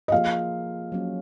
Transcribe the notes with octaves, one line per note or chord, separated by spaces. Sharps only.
D#5
F3 A#3 F4 G#4 F5
F#3 A#3 C#4